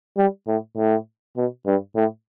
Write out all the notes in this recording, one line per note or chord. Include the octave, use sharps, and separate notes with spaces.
G3
A2
A2
B2
G2
A2